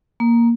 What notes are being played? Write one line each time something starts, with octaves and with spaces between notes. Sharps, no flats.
A#3